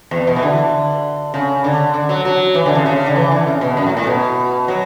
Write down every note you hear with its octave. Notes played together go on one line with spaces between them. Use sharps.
E2
B2
E3
D3
C#3
D3
D3
F#3
F#3
E3
D3
C#3
C#3
C#3
D3
E3
D3
C#3
B2
F#2
A2
A2
B2
F#3